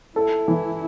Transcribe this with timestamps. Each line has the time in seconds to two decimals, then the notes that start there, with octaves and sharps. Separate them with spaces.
0.16 E4 A4
0.48 E3